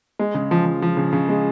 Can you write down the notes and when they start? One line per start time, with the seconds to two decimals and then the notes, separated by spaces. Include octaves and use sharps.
0.19 G#3
0.34 C#3
0.51 F3
0.66 F3
0.82 F3
0.97 C#3
1.13 C#3
1.29 G#3